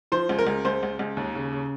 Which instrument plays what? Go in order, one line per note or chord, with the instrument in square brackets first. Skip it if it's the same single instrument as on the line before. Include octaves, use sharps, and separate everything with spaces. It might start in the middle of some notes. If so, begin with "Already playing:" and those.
[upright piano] F3 C5
C#2
A#4
C#2
C#2 C5
C#2
C#2
D#2
C#3
C#3